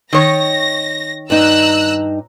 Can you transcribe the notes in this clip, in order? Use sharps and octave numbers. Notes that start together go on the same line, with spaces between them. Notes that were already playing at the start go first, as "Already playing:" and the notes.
D#3 C#5 A#6
G2 D#4 A#5 E6 F#6